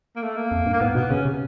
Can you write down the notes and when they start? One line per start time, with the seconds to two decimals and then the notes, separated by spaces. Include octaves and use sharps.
0.16 A#3
0.22 A3
0.37 A#3
0.51 F2
0.66 G2
0.73 A#3
0.81 G#2 B3
0.95 B2 B3
1.10 C#3 C#4
1.25 C3